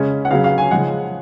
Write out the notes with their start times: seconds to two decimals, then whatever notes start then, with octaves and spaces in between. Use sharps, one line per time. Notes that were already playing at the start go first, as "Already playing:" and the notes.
Already playing: C#3 G#3 C#4
0.25 F#5
0.31 C#3 F#3 C#4 F5
0.44 F5
0.58 G#5
0.71 C#3 F3 G#3 F#5